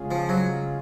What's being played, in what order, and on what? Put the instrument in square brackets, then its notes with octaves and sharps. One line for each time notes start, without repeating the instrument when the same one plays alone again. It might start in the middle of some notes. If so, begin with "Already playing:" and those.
Already playing: [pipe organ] C#3 G#3 C#4 F4 G#4
[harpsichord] F3
F#3